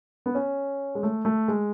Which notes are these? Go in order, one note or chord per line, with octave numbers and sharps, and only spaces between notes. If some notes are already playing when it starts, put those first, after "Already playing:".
B3
C#4
G#3
A3
A3
G#3